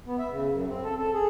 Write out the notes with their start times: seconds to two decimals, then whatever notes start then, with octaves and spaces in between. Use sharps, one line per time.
0.06 B3
0.19 E5
0.31 C#3
0.49 F#2
0.68 C4
0.83 A4
0.99 A4
1.14 G#4